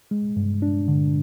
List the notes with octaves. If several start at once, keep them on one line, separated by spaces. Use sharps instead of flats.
G#3
G2
D4
D3